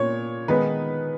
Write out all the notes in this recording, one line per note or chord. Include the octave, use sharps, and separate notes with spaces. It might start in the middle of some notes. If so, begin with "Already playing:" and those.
Already playing: A#2 C#5
D#3 G#3 B3 D#4 B4